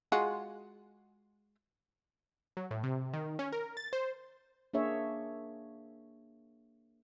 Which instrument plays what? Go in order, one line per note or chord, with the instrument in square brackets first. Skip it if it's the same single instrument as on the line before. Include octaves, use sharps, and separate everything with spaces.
[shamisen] G#3 F4 F#4
[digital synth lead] F#3
A2
C3
D#3
C#4
A#4
A6
C5
[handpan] A#3 D4 G#4 C#5 E5